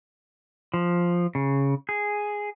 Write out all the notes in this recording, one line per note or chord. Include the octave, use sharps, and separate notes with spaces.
F3
C#3
G#4